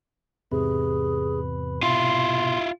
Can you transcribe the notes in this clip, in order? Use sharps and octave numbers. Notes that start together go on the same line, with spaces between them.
E2 G#2 C3 G#4 B4
B2 E4 F4 C6 G6